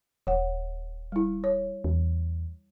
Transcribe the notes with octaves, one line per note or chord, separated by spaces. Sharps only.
D#1 C#5 F#5
G3 E4
C#5
E2